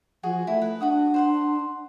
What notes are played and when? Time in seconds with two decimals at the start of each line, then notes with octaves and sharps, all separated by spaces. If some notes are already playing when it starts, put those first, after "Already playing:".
0.23 F3 F#4 G#4 G#5
0.47 A3 E4
0.62 B4
0.81 D4 F#4 F#5 D#6
1.14 C5 F#5 C6